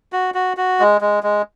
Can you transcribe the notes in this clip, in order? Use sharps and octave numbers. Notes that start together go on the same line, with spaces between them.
F#4
F#4
F#4
G#3
G#3
G#3